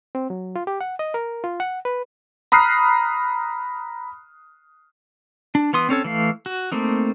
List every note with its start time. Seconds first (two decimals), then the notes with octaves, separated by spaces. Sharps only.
0.15 C4
0.30 F#3
0.56 F4
0.67 G4
0.81 F#5
0.99 D#5
1.14 A#4
1.44 F4
1.60 F#5
1.85 B4
2.52 A#5 B5 D#6 F6 F#6 C7
5.55 D4
5.73 E3 B3 C6 D#6
5.89 C4 C#4 A4 C#5
6.04 E3 A3 F5
6.46 F#4
6.72 A3 A#3 C4 D#4